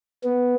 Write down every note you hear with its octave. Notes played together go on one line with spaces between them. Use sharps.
B3